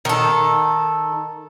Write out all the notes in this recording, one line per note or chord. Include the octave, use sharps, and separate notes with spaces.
D#3 A4